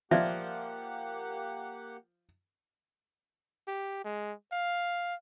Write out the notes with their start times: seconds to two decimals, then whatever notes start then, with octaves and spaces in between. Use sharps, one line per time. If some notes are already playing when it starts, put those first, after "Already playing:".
0.11 F3 A#3 G4 D5 E5 F#5
3.67 G4
4.04 G#3
4.52 F5